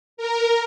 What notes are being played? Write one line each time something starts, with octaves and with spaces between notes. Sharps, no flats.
A#4